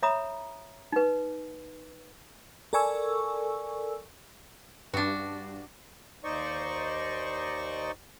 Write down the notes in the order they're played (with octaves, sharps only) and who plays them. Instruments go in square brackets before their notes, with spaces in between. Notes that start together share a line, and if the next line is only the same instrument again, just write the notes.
[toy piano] C#5 E5 A#5 B5 D#6
D#4 B4
[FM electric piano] A4 A#4 D5 G#5 C#6 E6
[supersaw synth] G2 [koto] D4 F#4
[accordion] D#2 D#4 C5 D5 D#5 C#6